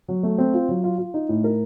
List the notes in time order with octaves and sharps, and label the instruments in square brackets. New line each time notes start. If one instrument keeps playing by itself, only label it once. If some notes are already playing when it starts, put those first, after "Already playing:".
[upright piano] F#3
A3
C4
F4
F#3
F4
F4
D#4
A2
A#4